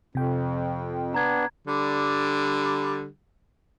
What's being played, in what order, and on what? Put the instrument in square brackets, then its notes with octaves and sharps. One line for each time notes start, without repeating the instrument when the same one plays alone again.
[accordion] F2 [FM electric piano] C3 G5
[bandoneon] B3 D4 [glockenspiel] A#5 G#6
[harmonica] D3 G3